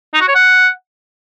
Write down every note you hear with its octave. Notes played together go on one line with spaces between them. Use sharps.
D#4
F#4
C#5
F#5